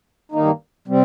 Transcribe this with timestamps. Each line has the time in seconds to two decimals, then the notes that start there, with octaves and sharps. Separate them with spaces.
0.32 G2 D#3 A#3 D#4
0.88 C3 G3 C4